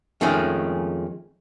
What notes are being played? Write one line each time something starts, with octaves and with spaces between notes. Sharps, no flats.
F2 D#3 F3 G#3 A3 C#4